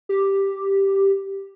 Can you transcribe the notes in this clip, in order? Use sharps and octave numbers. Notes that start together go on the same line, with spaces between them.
G4